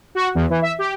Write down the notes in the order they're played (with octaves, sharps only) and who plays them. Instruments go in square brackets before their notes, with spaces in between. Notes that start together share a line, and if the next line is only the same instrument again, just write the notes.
[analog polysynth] F#4
E2
E3
E5
G4